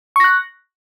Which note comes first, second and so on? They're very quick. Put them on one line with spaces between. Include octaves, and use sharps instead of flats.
C#6 A#6 F#6